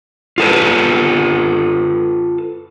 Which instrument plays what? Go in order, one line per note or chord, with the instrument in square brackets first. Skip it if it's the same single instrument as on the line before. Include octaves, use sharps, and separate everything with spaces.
[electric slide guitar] F4 A4 B4